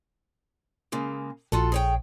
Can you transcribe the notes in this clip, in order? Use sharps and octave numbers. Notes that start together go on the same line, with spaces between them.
C#3 G#3 A#3
A#1 F4 F#4 A4
G#4 C#5 G5